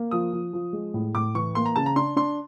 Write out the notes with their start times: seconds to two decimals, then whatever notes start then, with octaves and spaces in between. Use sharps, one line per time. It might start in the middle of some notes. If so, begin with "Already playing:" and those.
Already playing: A#3
0.11 F3 D#6
0.33 F3
0.53 F3
0.73 G#3
0.94 A2
1.15 A2 D6
1.35 E3 C#6
1.55 A#3 C6
1.66 A#5
1.76 C#3 A5
1.86 A#5
1.96 D4 C6
2.16 D4 C6